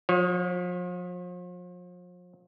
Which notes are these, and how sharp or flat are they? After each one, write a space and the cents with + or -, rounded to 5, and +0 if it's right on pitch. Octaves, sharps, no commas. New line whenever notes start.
F3 +40 C#5 +0